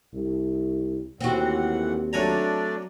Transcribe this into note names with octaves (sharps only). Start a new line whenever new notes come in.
C2
D#2 A2 E3 C4 F#4 F#5
F#3 A3 D4 D5 G#5 A#5